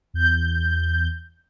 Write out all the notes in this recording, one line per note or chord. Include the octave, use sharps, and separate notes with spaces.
E2 G6